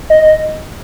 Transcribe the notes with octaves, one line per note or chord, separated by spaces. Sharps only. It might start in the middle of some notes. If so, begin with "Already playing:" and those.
D#5